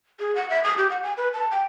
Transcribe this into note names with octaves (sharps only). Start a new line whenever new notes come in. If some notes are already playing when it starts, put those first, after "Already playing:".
G#4
F#5
E5
D#6
G4
F#5
G#5
B4
A5
G5